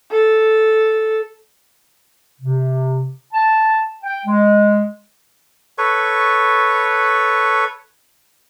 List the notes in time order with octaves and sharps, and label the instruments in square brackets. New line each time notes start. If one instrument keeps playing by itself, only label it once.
[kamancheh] A4
[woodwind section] C3
A5
G5
G#3
[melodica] A4 B4 C#5 C#6